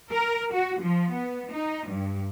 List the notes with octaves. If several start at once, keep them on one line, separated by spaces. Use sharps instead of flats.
A#4
F#4
F3
B3
D#4
G2